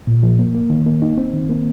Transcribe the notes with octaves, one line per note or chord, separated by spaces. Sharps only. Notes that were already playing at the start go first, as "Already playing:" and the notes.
A#2
F3
A#3
A#3
D#3
A#3
D#4
C4
D#3
A#3